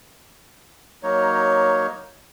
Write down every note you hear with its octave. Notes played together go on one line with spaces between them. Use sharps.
F#3 A#3 D#4 C#5